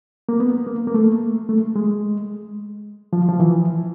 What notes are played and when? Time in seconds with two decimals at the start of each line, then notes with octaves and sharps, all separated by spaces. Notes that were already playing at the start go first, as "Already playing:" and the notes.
0.29 A#3
0.40 B3
0.67 A#3
0.87 A#3
0.94 A3
1.49 A3
1.76 G#3
3.13 F3
3.29 F3
3.40 E3